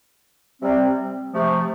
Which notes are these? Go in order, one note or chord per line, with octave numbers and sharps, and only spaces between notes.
C3 G3 C4
C3 F3 A3